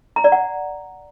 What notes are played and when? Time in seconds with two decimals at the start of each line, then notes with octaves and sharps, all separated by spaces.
0.16 A#5
0.24 D5
0.32 F#5